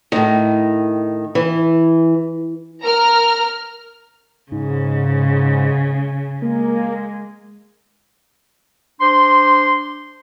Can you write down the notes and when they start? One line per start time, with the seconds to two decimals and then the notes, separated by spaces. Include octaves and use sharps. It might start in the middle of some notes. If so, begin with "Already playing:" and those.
0.12 A2 D#3
1.35 E3
2.83 A#4 A#5 F6
4.52 G#2 C#3
6.42 G#3 A#3
9.01 D4 C5 C6